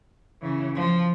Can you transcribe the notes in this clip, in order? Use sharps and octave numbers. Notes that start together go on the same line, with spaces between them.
C#3 E3
F3